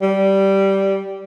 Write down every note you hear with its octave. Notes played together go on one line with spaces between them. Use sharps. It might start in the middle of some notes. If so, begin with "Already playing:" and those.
G3